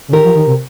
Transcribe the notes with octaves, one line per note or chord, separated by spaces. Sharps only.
C#3
D#3 G4 A#4
F3
D#3
C3